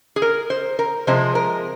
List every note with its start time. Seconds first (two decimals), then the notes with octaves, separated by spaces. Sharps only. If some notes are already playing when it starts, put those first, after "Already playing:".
0.16 G#4
0.22 A#4
0.50 C5
0.79 A#4
1.07 C3 F3 G#3 C5
1.35 A#4